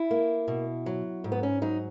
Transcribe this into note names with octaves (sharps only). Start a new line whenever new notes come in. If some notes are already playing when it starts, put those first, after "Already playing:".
Already playing: E4
A#3
B2
F#3
G#2
B3
C#4
F#3 D#4